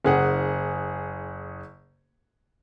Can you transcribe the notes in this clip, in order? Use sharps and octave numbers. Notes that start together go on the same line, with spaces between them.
F#1 G#4 F#5